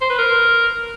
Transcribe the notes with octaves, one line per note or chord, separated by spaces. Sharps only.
C5
B4
A#4